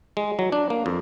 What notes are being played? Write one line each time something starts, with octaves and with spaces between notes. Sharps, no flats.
G#3
F#3
D4
A#3
F2